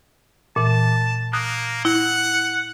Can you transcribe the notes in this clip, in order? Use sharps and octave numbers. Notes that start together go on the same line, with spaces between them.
A#2 E3 A5
A#3 D#6 F#6
E4 F#5